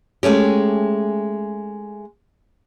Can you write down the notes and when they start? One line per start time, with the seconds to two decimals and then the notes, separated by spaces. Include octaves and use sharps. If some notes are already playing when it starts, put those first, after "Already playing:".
0.23 G#3 A3 C#4 G4